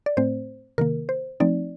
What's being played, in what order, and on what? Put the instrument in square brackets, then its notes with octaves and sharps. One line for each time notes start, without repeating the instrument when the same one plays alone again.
[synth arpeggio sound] D5
A2 A3 C4 C5
C3 D#3 A#3 A#4
C5
F3 A3 C4 D#4 D5